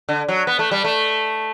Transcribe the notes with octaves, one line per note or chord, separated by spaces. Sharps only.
D3
F#3
B3
A3
G3
A3